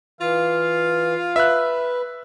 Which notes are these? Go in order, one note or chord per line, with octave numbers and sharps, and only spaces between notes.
E3 F4 F5
B4 E5 F#6